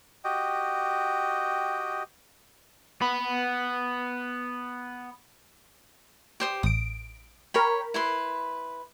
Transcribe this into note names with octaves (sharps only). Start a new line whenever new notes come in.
F#4 G4 D#5 G5
B3 B5
G4 C5 D#6
A1 D#6 D7
A#4 C#5 G5 B5
E4 B4 C6